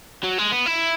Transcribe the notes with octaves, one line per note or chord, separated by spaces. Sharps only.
F#3
G#3
B3
E4